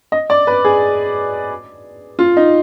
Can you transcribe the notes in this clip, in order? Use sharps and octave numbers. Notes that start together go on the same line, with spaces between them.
D#5
D5
B4
G#4
F4
D#4